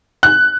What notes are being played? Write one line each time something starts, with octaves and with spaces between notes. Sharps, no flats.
F#6